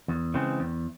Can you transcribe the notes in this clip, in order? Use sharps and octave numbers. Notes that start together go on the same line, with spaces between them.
E2
C#3 E3 G#3 C4
E2